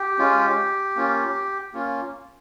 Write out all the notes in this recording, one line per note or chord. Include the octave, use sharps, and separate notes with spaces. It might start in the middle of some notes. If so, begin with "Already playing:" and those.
Already playing: G4
G#3 C#4 F4
A#3 C#4 F4
A#3 C#4 F4